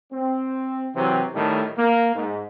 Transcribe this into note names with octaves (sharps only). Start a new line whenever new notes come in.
C4
C3 E3 F#3 C4
A2 D#3 G3 A3
A#3
G#2